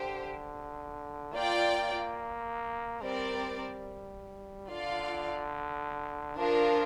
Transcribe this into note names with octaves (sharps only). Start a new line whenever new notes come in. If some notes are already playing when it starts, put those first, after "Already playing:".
Already playing: D3 G4 C5
A#3 F4 D5 G5
G3 C4 A#4 D5
D3 F4 D5 F5
F3 D4 F4 A#4